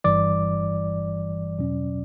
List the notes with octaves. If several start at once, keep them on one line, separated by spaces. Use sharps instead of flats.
G1 G2 E3 G3 D5 D6
E2 B2 F#3 C#4